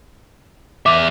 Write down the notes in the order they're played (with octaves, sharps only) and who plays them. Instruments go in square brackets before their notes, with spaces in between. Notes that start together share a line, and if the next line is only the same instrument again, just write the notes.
[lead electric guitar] E2 E5 [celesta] D6